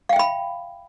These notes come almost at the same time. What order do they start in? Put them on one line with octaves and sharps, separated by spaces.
F5 G5 E5 B5